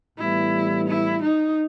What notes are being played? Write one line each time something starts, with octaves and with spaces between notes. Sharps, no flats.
A2 E3 G3 B3 E4
E4
D#4